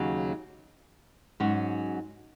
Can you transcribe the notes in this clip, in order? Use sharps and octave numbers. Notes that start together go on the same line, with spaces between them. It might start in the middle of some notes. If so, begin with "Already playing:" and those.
Already playing: D#2 C#3 F#3
G#2 F#3 C#4 F#4